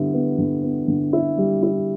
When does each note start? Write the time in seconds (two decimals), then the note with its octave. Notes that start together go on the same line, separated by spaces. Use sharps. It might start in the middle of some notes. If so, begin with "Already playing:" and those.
Already playing: D3 G3 B3 E4
0.14 B3
0.39 D3
0.63 B3
0.88 D3
1.13 E4
1.38 G3
1.63 E4